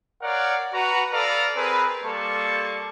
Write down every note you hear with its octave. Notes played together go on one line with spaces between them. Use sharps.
A#4 C#5 D5 F5 F#5
F#4 B4 A#5
A4 B4 D5 F5 A5 A#5
C4 G#4 A#4 B4
G3 A#3 A4 A5 C6 C#6